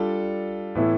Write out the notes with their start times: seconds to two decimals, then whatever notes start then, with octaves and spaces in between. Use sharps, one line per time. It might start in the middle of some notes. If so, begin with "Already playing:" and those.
Already playing: G3 D4 F4 A4
0.75 A2 E3 B3 E4 A4